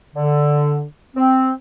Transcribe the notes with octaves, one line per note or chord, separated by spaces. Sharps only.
D3
C4